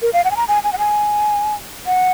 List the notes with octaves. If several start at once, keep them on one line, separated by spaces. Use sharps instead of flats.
A#4
F5
F#5
G#5
A#5
G#5
G#5
F#5
G#5
F#5